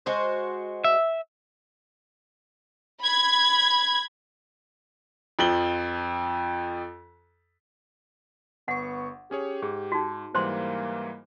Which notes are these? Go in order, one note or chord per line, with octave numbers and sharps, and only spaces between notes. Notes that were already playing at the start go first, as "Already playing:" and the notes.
G#3 F#4 C5
E5
B5 G#6
F2 F3 F#7 G7
G1 B3 F#5 C#6
C#4 G4 G#4 C#5
G#2 G#4
D#4 F#4
G#2 E3 G3 A#3 C5 C6